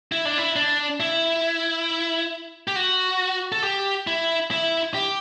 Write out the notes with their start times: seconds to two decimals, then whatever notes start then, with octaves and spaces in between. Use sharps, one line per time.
0.12 E4
0.25 D4
0.38 E4
0.56 D4
1.00 E4
2.68 G4
2.76 F#4
3.52 A4
3.64 G4
4.07 E4
4.51 E4
4.94 G4